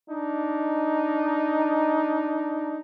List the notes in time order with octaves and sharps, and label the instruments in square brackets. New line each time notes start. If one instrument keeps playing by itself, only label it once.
[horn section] D4 D#4